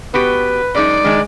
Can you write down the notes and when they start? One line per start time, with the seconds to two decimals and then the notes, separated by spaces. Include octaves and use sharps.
0.14 B3 F#4 G4 B4
0.75 F#2 G#3 D#4 D5
1.04 D#3 G#3 D4